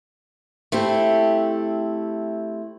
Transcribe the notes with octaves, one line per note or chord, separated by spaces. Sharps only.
A3 C4 E4 G4